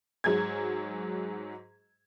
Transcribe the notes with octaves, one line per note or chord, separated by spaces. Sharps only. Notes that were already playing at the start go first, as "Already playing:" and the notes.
G#2 F#3 G#4 G#6